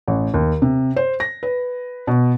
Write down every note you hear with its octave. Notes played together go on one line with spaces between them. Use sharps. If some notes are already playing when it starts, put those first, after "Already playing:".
A1
D#2
C3
C5
A#6
B4
B2